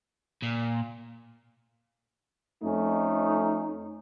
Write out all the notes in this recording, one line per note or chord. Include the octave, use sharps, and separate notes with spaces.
A#2
F2 A3 C#4 D#4